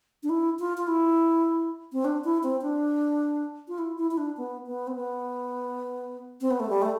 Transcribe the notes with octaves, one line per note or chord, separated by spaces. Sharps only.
D4
E4
F4
F4
E4
C4
D4
E4
C4
D4
F4
E4
E4
E4
D4
B3
B3
C4
B3
C4
B3
A3
G3
A3